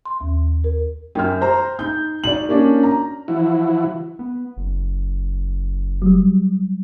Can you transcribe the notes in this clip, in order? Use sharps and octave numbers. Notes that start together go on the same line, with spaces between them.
C6
D#2
A#4
F#2 G5 F6
C5 A#5
D#4 G6
D#4 F#4 D5 F#7
A#3 C#4 D4
A#5
E3 F3 E4 F#4
B3
F#1
F#3 G3